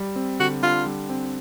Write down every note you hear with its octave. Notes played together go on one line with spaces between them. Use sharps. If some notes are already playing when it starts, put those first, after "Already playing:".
Already playing: G3
C4
D3 F#4
D3 F4
G3
C4